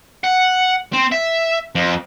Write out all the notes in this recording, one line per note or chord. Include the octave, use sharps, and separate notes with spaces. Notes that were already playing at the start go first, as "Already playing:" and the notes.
F#5
C4
E5
F2